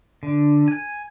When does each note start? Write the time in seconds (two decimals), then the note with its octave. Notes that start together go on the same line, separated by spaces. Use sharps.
0.23 D3
0.68 G#5